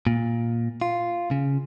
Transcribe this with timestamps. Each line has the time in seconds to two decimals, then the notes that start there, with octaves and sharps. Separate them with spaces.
0.07 A#2
0.81 F4
1.31 C#3